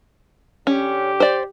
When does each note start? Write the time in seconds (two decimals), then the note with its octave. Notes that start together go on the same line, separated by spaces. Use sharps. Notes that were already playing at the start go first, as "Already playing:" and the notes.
0.67 D3 C#4 G4
1.20 C5 D5